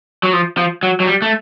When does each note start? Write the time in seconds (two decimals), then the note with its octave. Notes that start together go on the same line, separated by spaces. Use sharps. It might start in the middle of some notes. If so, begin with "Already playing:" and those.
0.23 F#3
0.33 F3
0.57 F3
0.83 F#3
1.00 F#3
1.06 G3
1.22 A3